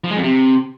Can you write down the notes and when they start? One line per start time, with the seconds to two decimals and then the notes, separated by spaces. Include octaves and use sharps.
0.04 F3
0.10 G#3
0.17 F2
0.23 C3